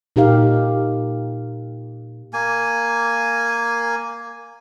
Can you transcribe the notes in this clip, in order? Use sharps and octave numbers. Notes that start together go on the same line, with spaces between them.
A#2 D#4 G4 A#4 F5
A#3 G#5